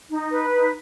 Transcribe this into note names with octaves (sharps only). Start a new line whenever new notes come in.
D#4
B4
D#4